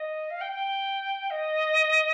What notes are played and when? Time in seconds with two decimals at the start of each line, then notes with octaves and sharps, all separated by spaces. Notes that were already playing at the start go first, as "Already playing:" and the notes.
Already playing: D#5
0.30 F5
0.41 G5
0.52 G5
1.30 D#5